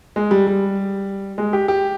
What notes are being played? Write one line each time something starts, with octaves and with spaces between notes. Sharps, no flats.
G#3
G3
G3
G#3
G4
G4